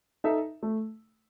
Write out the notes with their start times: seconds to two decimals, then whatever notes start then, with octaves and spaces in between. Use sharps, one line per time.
0.24 D#4 A4 E5
0.63 A3